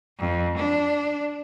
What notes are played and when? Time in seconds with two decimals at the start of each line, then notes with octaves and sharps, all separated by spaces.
0.19 F2
0.57 D4